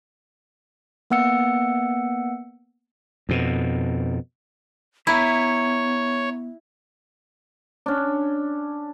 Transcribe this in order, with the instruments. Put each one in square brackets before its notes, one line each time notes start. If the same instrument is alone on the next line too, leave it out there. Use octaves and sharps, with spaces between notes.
[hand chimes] A#3 B3 F#5 E6 C#7
[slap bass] F2 B2
[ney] B3 [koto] E4 [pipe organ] C#5 [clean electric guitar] E5 G#5 A#5
[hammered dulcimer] C#4 D4